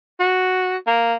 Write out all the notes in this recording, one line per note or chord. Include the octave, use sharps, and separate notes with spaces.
F#4
A#3